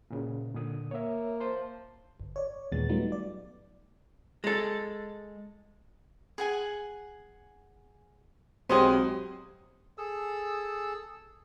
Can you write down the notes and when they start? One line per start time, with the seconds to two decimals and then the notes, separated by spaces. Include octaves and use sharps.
0.10 A#2 C#3
0.54 A#2 D3 D#6
0.91 A#3 C#5 E5
1.40 C5 A5 C6
2.20 G1
2.36 C#5 D5
2.72 D#2 A#2 G#3 B3 A6
2.89 F#3 G3 A3 B3 D#4 F4
3.12 D5
4.44 G#3 A4
6.38 G#4 F#5 G#5
8.69 B1 F#3 G#3 C4 G4 C5 D#5 G#5
9.98 G#4 A4 E6